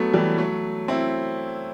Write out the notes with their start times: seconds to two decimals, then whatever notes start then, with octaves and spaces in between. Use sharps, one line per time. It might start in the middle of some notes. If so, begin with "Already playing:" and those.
Already playing: F#3 A3 B3
0.13 E3 G3
0.38 F#3 A3
0.88 C4 E4